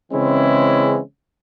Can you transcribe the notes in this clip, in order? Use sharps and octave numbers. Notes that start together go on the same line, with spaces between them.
C#3 E3 G#3 C4 C#4 E4